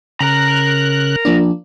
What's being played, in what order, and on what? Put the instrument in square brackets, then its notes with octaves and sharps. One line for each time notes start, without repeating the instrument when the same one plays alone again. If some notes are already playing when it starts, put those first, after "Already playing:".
[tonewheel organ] C#3 F#6 [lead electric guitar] A#4 A#5
[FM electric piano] F3 A#3 D4